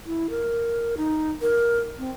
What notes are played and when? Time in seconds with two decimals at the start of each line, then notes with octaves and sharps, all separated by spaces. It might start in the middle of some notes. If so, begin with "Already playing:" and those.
0.06 E4
0.30 A#4
0.97 D#4
1.42 A#4
1.98 C4